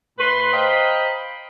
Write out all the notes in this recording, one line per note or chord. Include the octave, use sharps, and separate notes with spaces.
A2 B4 C6
C5 D#5 F5 G5 A#5 B5